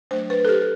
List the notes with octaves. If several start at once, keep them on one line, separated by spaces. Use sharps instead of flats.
F#3 A3 D4 C5
B4
A4
G4